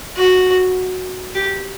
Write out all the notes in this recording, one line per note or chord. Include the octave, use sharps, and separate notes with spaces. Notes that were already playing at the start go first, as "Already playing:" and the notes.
F#4
G4